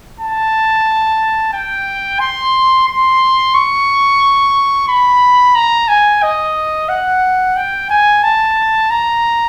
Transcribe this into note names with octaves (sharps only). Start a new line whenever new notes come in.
A5
G5
C6
C6
C#6
B5
A#5
G#5
D#5
F#5
G5
G#5
A5
A#5